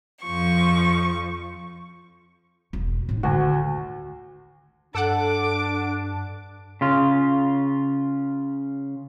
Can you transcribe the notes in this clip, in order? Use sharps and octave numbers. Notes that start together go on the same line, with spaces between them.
F2 F3 C#6
E1
A2 D4
D2 D#3 F#4
G2 D4 A4 F#5 D6 D7
C#3 F4